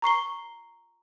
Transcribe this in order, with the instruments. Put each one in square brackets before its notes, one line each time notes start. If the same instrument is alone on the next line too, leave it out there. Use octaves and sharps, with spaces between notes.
[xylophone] A#5 C#6 C7 G7